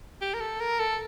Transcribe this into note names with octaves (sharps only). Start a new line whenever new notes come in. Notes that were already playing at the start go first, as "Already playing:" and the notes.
G4
A#4
A4
A#4
A4